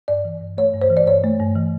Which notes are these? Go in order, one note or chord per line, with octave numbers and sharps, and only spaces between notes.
G2 D5
E3
G2
A3 C#5
G2
C5
E3
D5
G2 C#5
A3
G2
E3